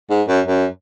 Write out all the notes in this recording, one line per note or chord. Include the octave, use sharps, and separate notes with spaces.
G#2
F#2
F#2